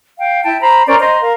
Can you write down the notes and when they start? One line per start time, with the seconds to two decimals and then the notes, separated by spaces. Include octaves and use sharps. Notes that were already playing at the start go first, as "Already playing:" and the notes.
0.19 F5 G5
0.44 E4 G5 A5
0.60 C5 A#5 B5
0.86 C#4 A#4 C5 D5
0.99 C5 D#5 A#5 C6
1.21 A#4 F5